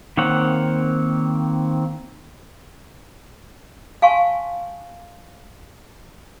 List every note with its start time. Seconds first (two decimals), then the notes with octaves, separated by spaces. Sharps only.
0.17 D#3 A#3 C4 C#5 F#5
4.02 F5 G#5 A5 C6 C#6